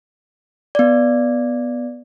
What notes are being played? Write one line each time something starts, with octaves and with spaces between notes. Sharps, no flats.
B3 D5